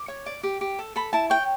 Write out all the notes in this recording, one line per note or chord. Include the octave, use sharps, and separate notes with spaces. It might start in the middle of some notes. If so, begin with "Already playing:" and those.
Already playing: D6
C#5
D5
G4
G4
A4
A4 B5
E4 A5
C#5 G5